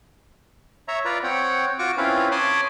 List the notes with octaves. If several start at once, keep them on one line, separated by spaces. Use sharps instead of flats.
C#5 E5 A#5
F4 B4 D5 A#5
C4 C#5 F#5 G5
F4 F#4 C#6 D6
C4 C#4 E4 F4 B4 F5
C#5 A5 B5 C6 D6 D#6